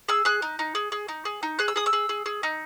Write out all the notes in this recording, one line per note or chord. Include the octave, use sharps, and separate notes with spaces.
G#4 E6
G#4 F#6
D#4
D#4
G#4
G#4
D#4
G#4
D#4
G#4 F#6
E6
G#4 D#6
E6
G#4
G#4
G#4
D#4